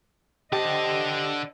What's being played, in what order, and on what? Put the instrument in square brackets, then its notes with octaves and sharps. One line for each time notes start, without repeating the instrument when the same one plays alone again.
[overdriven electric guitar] D3 A5 [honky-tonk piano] G4 [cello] C5 D#5